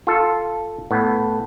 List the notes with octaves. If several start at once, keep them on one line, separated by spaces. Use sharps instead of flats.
F4 A4
A2 B3